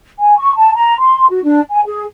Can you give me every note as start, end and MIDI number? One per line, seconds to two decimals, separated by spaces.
0.17 0.36 80
0.37 0.51 85
0.56 0.74 81
0.74 0.93 82
0.98 1.25 84
1.28 1.42 66
1.43 1.59 62
1.69 1.80 80
1.85 2.04 68